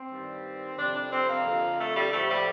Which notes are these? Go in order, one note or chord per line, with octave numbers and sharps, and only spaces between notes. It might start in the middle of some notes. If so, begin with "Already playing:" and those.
Already playing: C4
G2 D#3 G3
F2 C3 G3 D4
D4
C4
A#3
F2 D3 F3
A3
G3
A2 F3 A3
G3